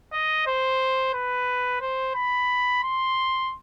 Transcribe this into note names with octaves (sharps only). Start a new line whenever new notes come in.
D#5
C5
B4
C5
B5
C6